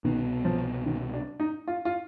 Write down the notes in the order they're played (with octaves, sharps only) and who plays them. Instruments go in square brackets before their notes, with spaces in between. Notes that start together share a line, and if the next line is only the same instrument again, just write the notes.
[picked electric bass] C2 B2 B3 [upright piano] D#3
[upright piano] F3
D#3
D4
D#4
F4
F4